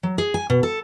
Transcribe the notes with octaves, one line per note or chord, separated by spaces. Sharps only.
F#3
G#4
G#5
B2
A4